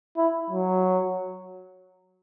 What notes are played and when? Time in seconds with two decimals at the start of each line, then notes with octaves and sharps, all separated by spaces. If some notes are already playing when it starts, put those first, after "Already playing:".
0.17 E4
0.50 F#3